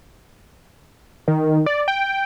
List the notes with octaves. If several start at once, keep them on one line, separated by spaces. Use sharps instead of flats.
D#3
D5
G5